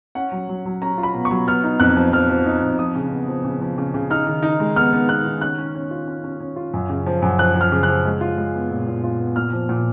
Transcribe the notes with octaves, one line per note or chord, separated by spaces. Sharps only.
C#4 F#5
F#3
F#3
F#3
C#4 A#5
F4
B5
B2
C#6
F#3
B3 F6
D#4
F2 F#6
F3
F3 F6
F3
D#4
F2
F3 D#6
C#3
B3
F3
C#3
F3
C#3
C#3
D#4 F6
D#3
D#4
G#3
B3 F6
B3
B3 F#6
D#3
C#4 F#6
C#4
C#4
F4
C#4
C#4
C#4
F4
F#2
C#3
F3
F#2
F3 F#6
F3
F6
C#3
F#6
F3
G#3
F4
G#3
B3
A#2
A#2
F4
B3
A#2 F6
F3
A#2